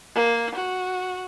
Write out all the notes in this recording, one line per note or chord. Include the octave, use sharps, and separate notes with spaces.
A#3
F#4